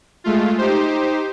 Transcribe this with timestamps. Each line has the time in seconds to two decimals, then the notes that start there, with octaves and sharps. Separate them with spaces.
0.24 G#3 A3 F4
0.58 D#4 G4 C5